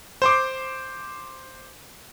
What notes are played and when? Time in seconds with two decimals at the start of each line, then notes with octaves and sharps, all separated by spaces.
0.22 C5 C6 D6